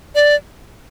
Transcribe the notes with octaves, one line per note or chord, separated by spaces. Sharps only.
D5